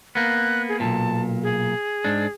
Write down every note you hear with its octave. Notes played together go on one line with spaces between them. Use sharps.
A#3 B3 F#6
G#4
B1 G2 A#2 A5
G#4
G#2 D4